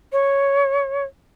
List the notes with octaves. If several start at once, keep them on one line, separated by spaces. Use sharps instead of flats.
C#5